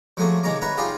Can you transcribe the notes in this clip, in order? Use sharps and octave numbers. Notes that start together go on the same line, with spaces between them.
F3 F#3 A3 A#3 G#4
C3 D#3 G#3 C#5 A#5 D6
B4 C#5 E5 F#5 A#5
D#4 F4 G4 G#4 D#5 F5